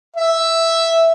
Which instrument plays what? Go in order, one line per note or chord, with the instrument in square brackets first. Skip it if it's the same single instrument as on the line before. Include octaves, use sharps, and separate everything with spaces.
[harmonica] E5